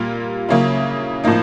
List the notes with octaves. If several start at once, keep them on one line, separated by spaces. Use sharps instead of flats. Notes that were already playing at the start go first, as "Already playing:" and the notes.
Already playing: A#2 G3 A#3 F4
C#3 F#3 A#3 C#4 E4
A2 F3 A#3 D#4